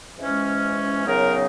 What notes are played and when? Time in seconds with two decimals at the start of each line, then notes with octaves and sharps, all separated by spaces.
0.18 G#2 E3 G#3 C#4
1.05 F#2 C#3 F#3 B3 D#4 A#4